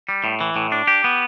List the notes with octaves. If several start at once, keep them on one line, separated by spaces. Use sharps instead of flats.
G3
A2
E3
A2
D4
G4
B3